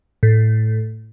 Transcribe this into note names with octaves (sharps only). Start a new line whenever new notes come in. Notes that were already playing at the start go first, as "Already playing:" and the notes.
A2